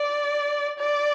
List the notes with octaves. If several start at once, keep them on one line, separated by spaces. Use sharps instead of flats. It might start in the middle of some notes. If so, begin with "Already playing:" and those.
Already playing: D5
D5